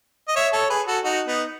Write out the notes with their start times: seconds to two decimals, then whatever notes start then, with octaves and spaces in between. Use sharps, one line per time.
0.28 D#5
0.36 C#5 E5
0.53 A4 C#5
0.70 G#4 B4
0.87 F#4 A4
1.04 D#4 F#4
1.27 B3 D#4